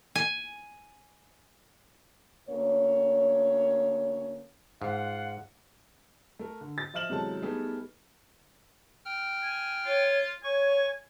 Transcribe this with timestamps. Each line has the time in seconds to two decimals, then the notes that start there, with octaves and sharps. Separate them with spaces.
0.15 G#5
2.49 D2 A#3 C#4 C#5
4.82 G#2 F4 F5 F#5
6.39 A3 A#4
6.61 D3
6.78 A6
6.94 F3 D#5 E5 F6 E7 F#7
7.10 E2 C3 F#3 G#3 A4 A5
7.42 G3 A3 B3 D#4 G4 G#4
9.05 G5 F6
9.43 G#5
9.86 F4 C#5
10.44 C#5 G#5 C#6